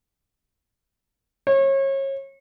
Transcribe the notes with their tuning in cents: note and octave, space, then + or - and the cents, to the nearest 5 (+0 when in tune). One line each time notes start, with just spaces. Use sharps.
C#5 -30